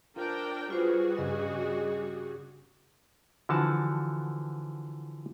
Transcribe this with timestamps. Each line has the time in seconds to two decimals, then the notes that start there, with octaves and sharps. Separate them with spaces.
0.16 D4 F4 A#4 C5 G5
0.70 G3 F4 F#4 G#4 B4 C5
1.18 G2 C#3 D#5
3.49 D3 E3 F3 F#4 A5